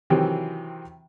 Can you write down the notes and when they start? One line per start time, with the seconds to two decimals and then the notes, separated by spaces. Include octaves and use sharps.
0.10 C3 D#3 E3 F#3 C4